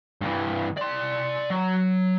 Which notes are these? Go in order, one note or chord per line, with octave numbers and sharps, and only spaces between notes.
G2 E3
D5 C6
F#3